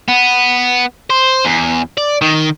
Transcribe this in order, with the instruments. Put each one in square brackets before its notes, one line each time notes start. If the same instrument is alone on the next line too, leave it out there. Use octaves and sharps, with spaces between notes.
[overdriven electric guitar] B3
C5
E2
D5
D#3